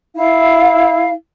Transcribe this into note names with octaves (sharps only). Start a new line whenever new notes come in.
E4 F5